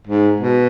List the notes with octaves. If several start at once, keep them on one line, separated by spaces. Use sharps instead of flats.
G#2
B2